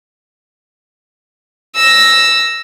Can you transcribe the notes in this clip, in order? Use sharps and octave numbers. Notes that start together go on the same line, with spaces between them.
E6 A#6